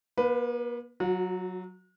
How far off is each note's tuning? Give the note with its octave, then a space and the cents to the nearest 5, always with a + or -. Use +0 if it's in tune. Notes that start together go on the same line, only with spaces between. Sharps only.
A#3 +45 B4 +5
F#3 +0 F#4 -40